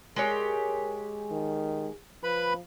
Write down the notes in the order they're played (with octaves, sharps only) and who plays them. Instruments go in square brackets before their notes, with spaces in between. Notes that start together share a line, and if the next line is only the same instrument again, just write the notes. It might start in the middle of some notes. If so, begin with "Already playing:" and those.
[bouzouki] G#3 G4 C#5 [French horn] A#4
[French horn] D#3
[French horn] F3 [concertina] B4 B5